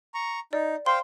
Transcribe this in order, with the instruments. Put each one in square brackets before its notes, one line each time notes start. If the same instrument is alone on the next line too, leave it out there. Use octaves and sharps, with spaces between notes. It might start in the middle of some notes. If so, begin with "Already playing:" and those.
[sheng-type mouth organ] A#5 C#6
[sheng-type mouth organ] D#4 [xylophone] D5
[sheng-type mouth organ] C5 F5 G5 [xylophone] C6